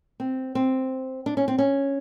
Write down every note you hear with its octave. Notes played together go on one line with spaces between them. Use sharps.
C4
C4
D4
C#4
C4
C#4